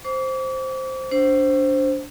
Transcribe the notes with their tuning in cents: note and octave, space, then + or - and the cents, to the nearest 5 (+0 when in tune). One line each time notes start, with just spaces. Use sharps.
C5 +0 D6 -40
D4 -20 C5 +0